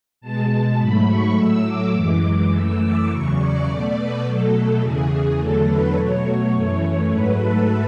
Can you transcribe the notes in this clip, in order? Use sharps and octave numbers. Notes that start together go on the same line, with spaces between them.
B2 G#3 A5
G#2 F#3 A3 B5
C#6
A2 F#3 A3 E6
D6
F#2 E3 G#3
F#2 E3 A3 E6
D6
E2 C#3 F#3 C#6
D5
B2 A3 D5
B4
B2 F#3 A3 A4
E2 C#3 E3 G#4
E2 D3 F#3 A3 A4
B4
B2 F#3 A3 C#5
C#5
F#2 E3 A3
G#2 F#3 A3 B4
A4